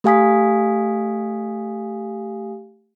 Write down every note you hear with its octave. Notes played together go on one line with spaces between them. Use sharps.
A3 G4 F5 G#5 D#6 B6